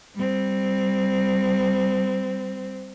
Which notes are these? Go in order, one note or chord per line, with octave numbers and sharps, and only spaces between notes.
G3 C4